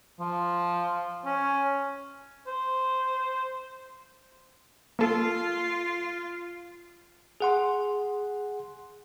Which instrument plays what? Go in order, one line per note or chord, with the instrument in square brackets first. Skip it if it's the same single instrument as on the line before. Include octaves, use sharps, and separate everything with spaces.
[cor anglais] F3
C#4
C5
[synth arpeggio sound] A#3 A4 [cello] F4
[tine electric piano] G#4 F#5 C6